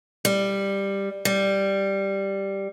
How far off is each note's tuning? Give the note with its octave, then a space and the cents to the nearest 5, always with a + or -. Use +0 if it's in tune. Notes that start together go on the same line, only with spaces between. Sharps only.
G3 +10
G3 +0